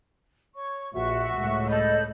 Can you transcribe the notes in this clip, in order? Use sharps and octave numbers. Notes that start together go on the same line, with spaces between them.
C#5 C#6
A#1 F3 F#4 E5 C#6
C#2 A2
A4 D#5 B5 G6